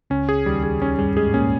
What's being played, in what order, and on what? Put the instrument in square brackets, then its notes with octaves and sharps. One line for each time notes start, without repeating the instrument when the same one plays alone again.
[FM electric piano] C#2 C#3 [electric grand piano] C#4
[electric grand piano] G#4
[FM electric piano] D#2 D#3 [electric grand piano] G3
[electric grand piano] G#4
[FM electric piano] D#2 D#3 [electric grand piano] C#4
[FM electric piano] G2 G3 [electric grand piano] G#4
[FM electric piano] G#2 G#3 [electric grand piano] G#4
[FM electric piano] A#2 A#3 [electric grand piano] C#4